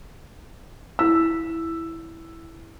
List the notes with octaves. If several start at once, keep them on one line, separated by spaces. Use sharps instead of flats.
E4 F5 E6